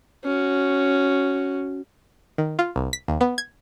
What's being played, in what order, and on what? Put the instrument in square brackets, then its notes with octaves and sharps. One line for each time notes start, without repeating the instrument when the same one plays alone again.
[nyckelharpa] C#4 F#4
[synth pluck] D#3
F4
C2
B6
D#2
B3
G#6